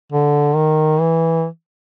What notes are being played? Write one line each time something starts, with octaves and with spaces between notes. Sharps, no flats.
D3
D#3
E3